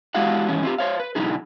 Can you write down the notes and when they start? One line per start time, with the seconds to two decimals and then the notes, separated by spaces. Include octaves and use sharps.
0.15 G#3 E4 F#4 G4 F5 F#5
0.48 G#2 D#3 E3 C#4
0.63 C4 F4 G4
0.78 C5 C#5 F5
1.00 B4
1.15 B2 D3 F#3 D#4 E4 G#4